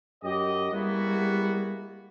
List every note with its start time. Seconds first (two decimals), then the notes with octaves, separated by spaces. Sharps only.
0.23 F#2 F#3 G4 D#5
0.73 G3 G#3 A#3 B3 E4 F#4